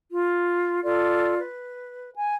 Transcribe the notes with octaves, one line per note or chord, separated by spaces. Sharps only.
F4
F4 A4 D5
B4
G#5